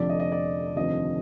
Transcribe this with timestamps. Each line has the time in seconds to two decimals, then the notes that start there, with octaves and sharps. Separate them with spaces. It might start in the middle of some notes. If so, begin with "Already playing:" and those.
Already playing: F1 F2 D3 F3 D5
0.09 D#5
0.20 D#5
0.32 D5
0.76 F1 D#2 D3 F3 C4 D#5